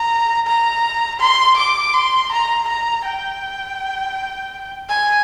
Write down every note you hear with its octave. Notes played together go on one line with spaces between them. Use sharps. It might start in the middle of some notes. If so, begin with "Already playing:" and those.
Already playing: A#5
A#5
C6
D6
C6
A#5
A#5
G5
G#5